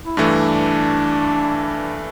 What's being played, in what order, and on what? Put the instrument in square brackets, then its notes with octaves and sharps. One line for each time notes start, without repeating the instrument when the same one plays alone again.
[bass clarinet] E4
[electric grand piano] G2 E3 A3 [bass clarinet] D4